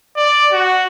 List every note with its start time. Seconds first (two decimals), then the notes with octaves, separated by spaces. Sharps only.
0.16 D5
0.52 F#4